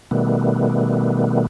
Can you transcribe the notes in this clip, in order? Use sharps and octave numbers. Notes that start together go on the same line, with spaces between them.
B2 D#3 G3 A3 B3